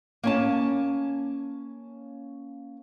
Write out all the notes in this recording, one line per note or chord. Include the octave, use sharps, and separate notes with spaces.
A#3 C#4 A5